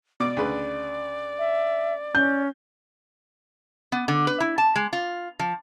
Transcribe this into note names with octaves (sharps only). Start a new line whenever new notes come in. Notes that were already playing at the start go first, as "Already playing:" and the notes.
B2 D5 D6
D2 C#3 B4
E5
C#4 G6
B3
D3
B4
E4
A5
G#3
F4
F3